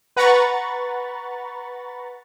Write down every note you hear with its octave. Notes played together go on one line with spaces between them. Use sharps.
B4 F#5 A#5 B5 C#6 A6